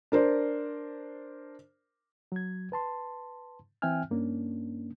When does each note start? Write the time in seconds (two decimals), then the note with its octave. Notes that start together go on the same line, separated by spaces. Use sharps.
0.12 D4 A#4 C5 D5
2.32 F#3 G#6
2.72 B4 A5 C6
3.82 E3 C4 E5 G5 G#5 F6
4.10 G2 A#3 C#4 D4